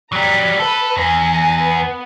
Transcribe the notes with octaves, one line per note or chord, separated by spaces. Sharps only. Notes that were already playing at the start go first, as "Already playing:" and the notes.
F#3 G3 A#5
A4 B4 B5
E2 G#5 A#6
B3